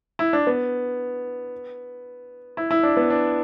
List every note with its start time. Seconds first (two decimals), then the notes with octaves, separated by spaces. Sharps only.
0.19 E4
0.33 D4
0.47 B3
2.57 E4
2.71 E4
2.83 D4
2.97 B3
3.10 D4